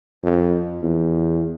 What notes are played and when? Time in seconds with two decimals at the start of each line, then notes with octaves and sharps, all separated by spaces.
0.23 F2
0.82 E2